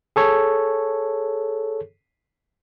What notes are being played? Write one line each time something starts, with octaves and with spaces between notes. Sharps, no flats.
G#4 A4 C#5